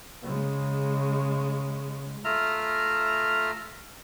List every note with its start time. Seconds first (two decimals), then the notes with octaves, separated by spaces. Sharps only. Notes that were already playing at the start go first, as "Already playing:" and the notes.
0.23 C#3 G#3
2.25 A3 F4 E5 A#5 F6